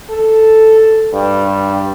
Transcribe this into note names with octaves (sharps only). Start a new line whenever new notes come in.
A4
G2